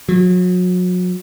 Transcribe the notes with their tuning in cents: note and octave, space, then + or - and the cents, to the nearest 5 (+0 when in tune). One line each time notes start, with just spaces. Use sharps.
F#3 -35